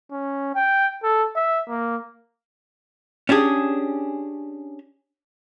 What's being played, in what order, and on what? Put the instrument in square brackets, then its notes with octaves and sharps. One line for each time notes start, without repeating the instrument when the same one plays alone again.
[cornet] C#4
G5
A4
E5
A#3
[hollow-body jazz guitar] C#4 D4 G4 G#4